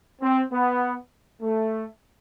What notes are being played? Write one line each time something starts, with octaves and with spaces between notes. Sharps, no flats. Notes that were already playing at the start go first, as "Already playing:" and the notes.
C4
B3
A3